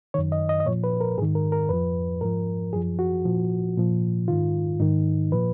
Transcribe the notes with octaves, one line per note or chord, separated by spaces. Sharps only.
F#2 D#3 C#5
D#5
D#5
D#5
A#2 F3 C#5
B4
A#4
G#2 D#3 G#4
A#4
A#4
F2 F3 B4
G#2 F3 A#4
F#2 F3 G#4
F#4
A#2 F3
A#2 F3
G#2 D#3 F4
G#2 D#3 D#4
A#2 F3 B4